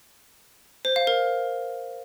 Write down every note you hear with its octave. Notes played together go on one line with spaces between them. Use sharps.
C5
F5
A#4